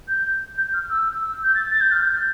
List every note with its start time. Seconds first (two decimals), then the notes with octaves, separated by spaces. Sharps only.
0.08 G6
0.58 G6
0.73 F6
0.90 E6
1.22 E6
1.43 G6
1.55 A6
1.71 A6
1.81 G6
1.91 F6
2.02 G6